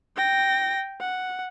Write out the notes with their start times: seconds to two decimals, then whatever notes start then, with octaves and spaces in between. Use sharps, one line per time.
0.16 G5 A#6
1.00 F#5